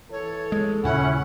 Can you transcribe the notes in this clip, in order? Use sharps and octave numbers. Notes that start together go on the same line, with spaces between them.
E3 A4 C#5
G#3
D#2 A#2 C#3 C#4 E4 F#5